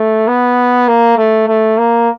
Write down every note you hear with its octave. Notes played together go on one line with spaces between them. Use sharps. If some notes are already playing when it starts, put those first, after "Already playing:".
Already playing: A3
B3
A#3
A3
A3
A#3